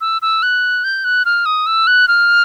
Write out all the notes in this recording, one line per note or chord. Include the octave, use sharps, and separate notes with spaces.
E6
E6
F#6
G6
F#6
F6
D#6
E6
F#6
F6